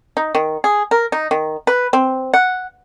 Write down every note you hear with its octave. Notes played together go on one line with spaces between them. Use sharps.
D#4
D#3
G#4
A#4
D#4
D#3
B4
C4
F#5